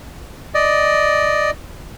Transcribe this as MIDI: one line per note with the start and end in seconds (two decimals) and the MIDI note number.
0.54 1.51 74
0.54 1.51 75